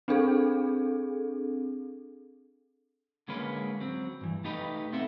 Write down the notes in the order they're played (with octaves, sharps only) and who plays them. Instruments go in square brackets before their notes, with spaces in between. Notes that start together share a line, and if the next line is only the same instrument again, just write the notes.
[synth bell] C4 D4 G#4 A4
[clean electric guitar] D3 G#3 A#3 C#4 B4
F#3 C4
G2 E3
A3 D#4 G4 B4
B1 B3 C4 A4 E5